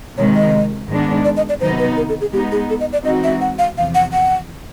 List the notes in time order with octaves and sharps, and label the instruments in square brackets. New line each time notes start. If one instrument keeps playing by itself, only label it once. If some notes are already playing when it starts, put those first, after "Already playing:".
[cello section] C3 D#3 G#3 [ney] C#5
[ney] D#5
[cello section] G#2 D#3 G#3 B3 D4
[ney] D5
D#5
D5
[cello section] C3 D#3 F#3 B3 D#4 [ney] C5
[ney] B4
A#4
A4
G#4
[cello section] G#3 B3 D#4 [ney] G4
[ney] G#4
A4
D#5
D5
[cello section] E3 G#3 C4 D#4 F#4 [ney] D#5
[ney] E5
F#5
F5
[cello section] E2 C3 F3 [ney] F5
[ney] F#5
F#5